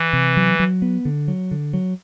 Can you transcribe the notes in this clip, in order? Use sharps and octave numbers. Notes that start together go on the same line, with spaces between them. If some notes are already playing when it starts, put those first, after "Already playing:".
Already playing: E3
C3
F#3
F#3
B3
D3
F#3
D3
F#3